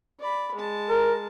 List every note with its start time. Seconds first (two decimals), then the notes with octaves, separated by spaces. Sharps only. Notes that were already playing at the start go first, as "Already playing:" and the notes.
0.19 D5 B5
0.55 G#3 A5
0.89 A#4